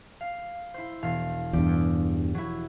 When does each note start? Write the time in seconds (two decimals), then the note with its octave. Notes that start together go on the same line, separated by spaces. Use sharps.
0.21 F5
0.74 E4 C5
1.02 E1 F5
1.53 E2 G2 G4
2.35 F#3 E4